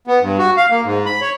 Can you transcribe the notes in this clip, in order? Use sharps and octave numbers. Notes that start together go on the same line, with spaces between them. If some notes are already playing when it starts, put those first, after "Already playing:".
B3
G2
F#4
F5
A#3
G#2
B5
C#5